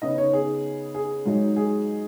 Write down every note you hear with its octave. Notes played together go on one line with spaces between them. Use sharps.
C#3 B3 D#4 D#5
C#5
G#4
G#4
G#2 F#3 D#4
G#4